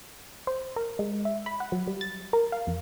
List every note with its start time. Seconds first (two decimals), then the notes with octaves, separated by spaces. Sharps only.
0.47 C5
0.76 A#4
0.99 G#3
1.25 E5
1.46 B5
1.60 F#5
1.72 F#3
1.87 G3
2.01 A6
2.33 A#4
2.52 F5
2.67 F2